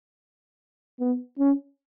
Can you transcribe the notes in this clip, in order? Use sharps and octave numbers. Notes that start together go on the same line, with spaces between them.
B3
C#4